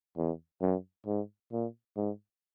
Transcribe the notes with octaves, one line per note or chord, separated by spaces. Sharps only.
E2
F#2
G#2
A#2
G#2